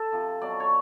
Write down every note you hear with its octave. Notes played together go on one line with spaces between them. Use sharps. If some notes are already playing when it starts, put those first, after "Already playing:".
Already playing: A4
C3 F3
B2 F#3 D5
C#5